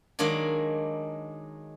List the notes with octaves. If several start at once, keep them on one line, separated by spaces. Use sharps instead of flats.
D#3 F#3 G#3 A#3 D4